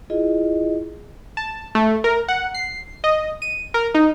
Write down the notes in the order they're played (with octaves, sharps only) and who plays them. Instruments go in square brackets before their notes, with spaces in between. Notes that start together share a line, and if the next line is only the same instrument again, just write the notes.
[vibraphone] E4 F4 G#4 D#5
[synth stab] A5
A3
A#4
F#5
C7
D#5
D#7
A#4
D#4